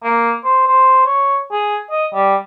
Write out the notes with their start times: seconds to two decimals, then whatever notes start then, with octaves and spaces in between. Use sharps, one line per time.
0.03 A#3
0.44 C5
0.67 C5
1.05 C#5
1.52 G#4
1.91 D#5
2.14 G3